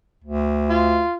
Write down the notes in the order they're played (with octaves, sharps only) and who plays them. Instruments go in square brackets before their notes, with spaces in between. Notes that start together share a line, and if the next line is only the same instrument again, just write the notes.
[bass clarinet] D2
[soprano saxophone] F4